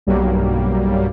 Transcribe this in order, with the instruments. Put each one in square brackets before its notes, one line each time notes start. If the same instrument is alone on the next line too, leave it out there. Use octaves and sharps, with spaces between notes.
[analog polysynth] B1 G2 F#3 G3 A#3